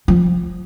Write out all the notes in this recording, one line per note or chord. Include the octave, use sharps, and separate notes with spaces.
F3